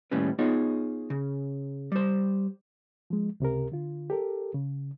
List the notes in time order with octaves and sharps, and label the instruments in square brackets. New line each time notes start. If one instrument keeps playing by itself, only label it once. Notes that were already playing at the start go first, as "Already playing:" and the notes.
[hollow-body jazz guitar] D#2 A2 G3 C#4 B4
B3 D#4 F4 G#4 C#5
C#3
G3 C5
[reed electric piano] F3 G#3
C#2 C3 G4 A#4
D3 F4
G4 A4 A#4
C#3